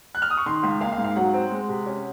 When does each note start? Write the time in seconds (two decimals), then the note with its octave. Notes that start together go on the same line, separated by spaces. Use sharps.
0.15 F#6
0.22 F6
0.30 D#6
0.37 C#6
0.46 D#3 C6
0.63 C#2
0.80 A#3 F5
0.93 F5
0.98 G#2
1.04 F5
1.16 F#3 F#5
1.33 C4
1.51 G#3
1.69 C3
1.86 C#4